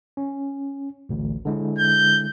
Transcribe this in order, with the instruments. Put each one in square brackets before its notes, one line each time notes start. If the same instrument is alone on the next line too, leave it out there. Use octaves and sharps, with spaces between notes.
[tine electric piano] C#4
A1 D2
D3 G#3 E4
[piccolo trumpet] G6